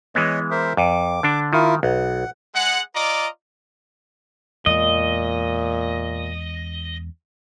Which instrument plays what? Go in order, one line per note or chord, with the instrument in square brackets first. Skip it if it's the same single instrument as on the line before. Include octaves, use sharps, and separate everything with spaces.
[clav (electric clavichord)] E3 G#3 B3 [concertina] C#5 D#5
[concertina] A#4 C5 E5
[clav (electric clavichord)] F2 [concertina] D6
[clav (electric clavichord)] D3 D4
[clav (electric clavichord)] D#3 [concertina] E4 F4 A#4
[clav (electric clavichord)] B1 [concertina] F#5
[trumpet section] G#3 F#5
F4 D5 D#5 A#5 D6
[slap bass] E2 G#3 [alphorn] A#2 [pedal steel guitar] D#5